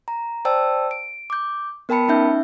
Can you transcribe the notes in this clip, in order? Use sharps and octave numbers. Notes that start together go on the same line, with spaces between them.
A#5
C5 D5 G5 A5 E6
D7
D6 G6
B3 A#4 G5 A5 B5 C#7
C#4 D#4 E5 G6